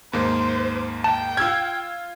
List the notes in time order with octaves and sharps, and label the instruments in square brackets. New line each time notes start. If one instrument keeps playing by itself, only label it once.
[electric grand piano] D#2 G#2 A#3 [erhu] C5
[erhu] G5 [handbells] A5
[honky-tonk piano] F4 G#6 [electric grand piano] E6 F6